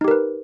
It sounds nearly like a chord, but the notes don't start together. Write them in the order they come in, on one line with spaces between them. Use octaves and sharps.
D#4 G4 A#4 B4